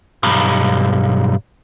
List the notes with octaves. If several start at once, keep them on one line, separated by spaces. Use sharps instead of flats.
B1 G2